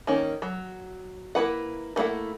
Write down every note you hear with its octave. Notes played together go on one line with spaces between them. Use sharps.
D#3 A#3 C#4
F#3
A#3 E4 B4 F#5
D#3 A3 A#3 E4 F#5